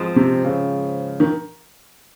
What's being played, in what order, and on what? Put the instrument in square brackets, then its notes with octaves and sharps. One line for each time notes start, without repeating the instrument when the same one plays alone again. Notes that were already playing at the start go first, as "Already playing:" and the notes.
Already playing: [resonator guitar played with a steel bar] G#2 F3 G#3 C4
[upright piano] C3
C#3
D#3